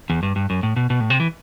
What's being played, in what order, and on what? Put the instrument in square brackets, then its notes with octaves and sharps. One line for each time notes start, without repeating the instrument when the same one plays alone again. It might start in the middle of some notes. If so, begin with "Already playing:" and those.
[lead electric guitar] E2
G2
G2
F#2
A2
B2
B2
A2
C3
E3